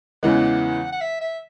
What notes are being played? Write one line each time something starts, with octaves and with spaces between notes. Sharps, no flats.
E2 C#3 E3 G#3 F#5
F#5
E5
E5